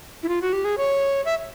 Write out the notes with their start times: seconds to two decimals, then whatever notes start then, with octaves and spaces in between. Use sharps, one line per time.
0.23 E4
0.28 F4
0.42 F#4
0.53 G4
0.64 G#4
0.78 C#5
1.25 E5